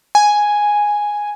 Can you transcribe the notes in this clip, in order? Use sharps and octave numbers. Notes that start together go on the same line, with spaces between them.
G#5